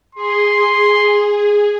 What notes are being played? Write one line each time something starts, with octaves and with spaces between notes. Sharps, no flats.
G#4 C6